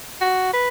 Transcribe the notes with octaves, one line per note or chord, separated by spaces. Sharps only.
F#4
B4